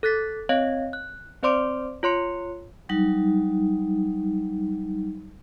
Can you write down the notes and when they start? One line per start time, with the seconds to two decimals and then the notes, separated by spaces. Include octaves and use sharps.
0.03 A4 F#6 A6 B6
0.49 C4 C#5 D#5 F5
0.93 F#6
1.43 C4 C5 D5 C6 D6 D7
2.03 F4 C#5 C6 C#7
2.89 F#3 G3 D#4